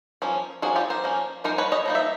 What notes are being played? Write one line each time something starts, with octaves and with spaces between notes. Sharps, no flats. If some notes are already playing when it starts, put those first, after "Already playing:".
F3 A#3 C#4
F3 A#3 C#4 F#4 G#4
F4 G4
A#4 C5
F3 A#3 C#4
F3 A#3 D#4 A#4 C5
B4 C#5
C#5 D#5
F3 A#3 D#4
E5